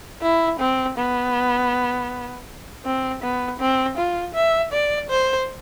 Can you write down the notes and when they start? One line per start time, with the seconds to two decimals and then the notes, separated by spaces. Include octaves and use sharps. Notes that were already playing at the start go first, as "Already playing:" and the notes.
0.22 E4
0.60 C4
0.97 B3
2.85 C4
3.22 B3
3.60 C4
3.97 F4
4.35 E5
4.72 D5
5.10 C5